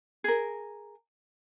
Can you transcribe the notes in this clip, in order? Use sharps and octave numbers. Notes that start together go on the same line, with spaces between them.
G#4 A#4